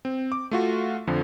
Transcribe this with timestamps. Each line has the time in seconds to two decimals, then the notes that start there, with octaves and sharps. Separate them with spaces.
0.05 C4
0.32 D6
0.51 A3 F4 F#4
1.07 F2 D3 F3